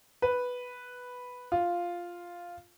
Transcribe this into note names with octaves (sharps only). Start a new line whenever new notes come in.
B4
F4